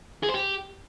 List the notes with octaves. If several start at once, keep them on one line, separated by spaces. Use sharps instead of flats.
G#4
C5
G4